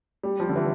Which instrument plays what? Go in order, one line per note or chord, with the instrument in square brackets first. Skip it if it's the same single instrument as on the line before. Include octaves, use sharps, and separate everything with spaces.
[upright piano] G3
F3
D3
E3